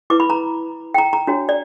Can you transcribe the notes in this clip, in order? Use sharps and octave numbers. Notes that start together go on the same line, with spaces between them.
E4 B4 D6
B5
A#5
G5
A#5
A#5
D4 F#4 C#5
D5